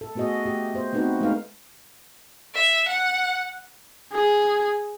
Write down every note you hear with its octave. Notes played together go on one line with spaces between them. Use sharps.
A4
A3 B3 F#4 G#4 D#5
A3 G4
B3 C5
A3 B3 C4 D#4 F#4 B4
G#3 A3 B3 D#4 B4 F5
E5
F#5
G#4